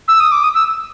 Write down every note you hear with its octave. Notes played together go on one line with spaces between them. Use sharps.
E6
D#6
D6
D#6
E6